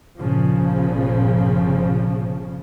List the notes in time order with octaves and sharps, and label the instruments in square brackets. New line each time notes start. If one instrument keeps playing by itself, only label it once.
[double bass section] G1 A#2 C#3 F3